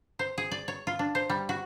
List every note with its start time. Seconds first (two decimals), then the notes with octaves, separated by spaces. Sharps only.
0.19 C5
0.38 G#4
0.51 D5
0.68 C#5
0.87 F4
0.99 D4
1.15 C5
1.30 G3
1.49 F#4